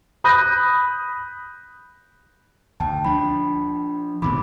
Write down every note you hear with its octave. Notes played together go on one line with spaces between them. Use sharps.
B5 D#6 F#6 G6 A#6 D#7
D2 G5 A5
F3 D4 B5
G#2 B2 D#3 B5 D6